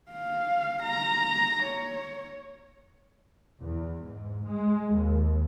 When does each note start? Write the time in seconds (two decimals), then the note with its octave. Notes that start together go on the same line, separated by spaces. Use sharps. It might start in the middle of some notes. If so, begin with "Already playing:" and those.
0.11 F5
0.83 A#5
1.63 C#5
3.61 E2
4.02 G#2
4.46 G#3
4.95 D#2